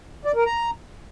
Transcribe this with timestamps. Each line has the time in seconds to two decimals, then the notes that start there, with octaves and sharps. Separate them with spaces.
0.25 D5
0.35 A#4
0.46 A#5